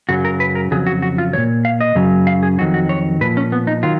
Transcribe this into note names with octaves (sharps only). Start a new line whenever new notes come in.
F#2 C#3 F#3 F#4
A#4
B4
A#4
F2 C#3 F#3 G#4
F#4
F#4
F4
A#2 F3 C#5
F5
D#5
F#2 C#3 F#3
F5
G#4
F2 D#3 F#3 F#4
F#4
C#5
A#2 F3 B4
C#4
B3
D#4
D#3 F#3 F4